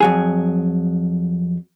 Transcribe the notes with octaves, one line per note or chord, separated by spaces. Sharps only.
F2 F#3 G#4